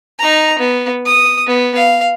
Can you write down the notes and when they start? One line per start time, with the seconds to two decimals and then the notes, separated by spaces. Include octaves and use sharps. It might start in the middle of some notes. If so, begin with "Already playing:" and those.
0.19 D#4 A#5
0.59 B3
1.06 D#6
1.47 B3
1.76 F5